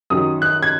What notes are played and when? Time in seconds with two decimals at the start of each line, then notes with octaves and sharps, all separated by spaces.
0.10 F#2 D#3 F#3 D#6
0.42 F#6
0.63 G#6